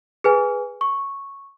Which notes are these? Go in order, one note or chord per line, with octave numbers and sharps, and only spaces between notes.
G#4 B4 G#5
C#6